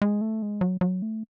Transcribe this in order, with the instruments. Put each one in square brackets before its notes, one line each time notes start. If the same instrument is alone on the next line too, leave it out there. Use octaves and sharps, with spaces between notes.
[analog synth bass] G#3
A3
G#3
F#3
F#3
A3